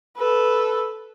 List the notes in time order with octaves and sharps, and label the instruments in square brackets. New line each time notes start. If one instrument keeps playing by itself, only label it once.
[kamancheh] A4 B4